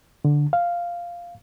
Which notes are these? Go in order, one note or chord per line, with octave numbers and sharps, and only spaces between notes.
D3
F5